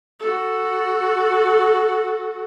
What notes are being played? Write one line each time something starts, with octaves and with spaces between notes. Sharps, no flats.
F#4 A4